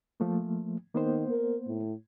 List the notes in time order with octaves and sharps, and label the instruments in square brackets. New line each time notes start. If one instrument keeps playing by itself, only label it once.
[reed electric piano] F3 A3 A#3
[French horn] D#3 [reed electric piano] A#3 B3 C5
[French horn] A#4
A2